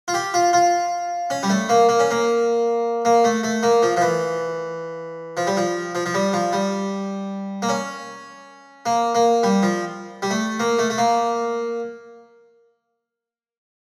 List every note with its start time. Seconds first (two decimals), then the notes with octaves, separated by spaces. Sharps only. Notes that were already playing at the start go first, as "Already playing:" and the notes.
0.08 F4
0.14 G4
0.34 F4
0.53 F4
1.30 C#4
1.43 G3
1.50 A3
1.69 A#3
1.89 A#3
1.99 C#4
2.11 A#3
3.05 A#3
3.24 A3
3.43 A3
3.63 A#3
3.82 F3
3.97 F3
4.01 E3
5.37 F3
5.47 G3
5.57 F3
5.95 F3
6.06 F3
6.14 G3
6.33 F3
6.53 G3
7.62 A#3
7.69 C#4
8.86 A#3
9.15 A#3
9.43 G3
9.63 F3
10.22 G3
10.31 A3
10.60 A#3
10.79 A3
10.90 A3
10.98 A#3